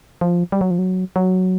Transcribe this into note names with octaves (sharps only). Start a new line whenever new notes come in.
F3
G3
F#3
F3
F#3
F#3